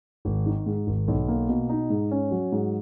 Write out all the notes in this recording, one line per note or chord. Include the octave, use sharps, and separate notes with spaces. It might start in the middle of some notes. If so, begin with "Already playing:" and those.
G#1
D#3
G#2
G#1
B1
A#3
B2
D#4
G#2
C#4
F#3
G#2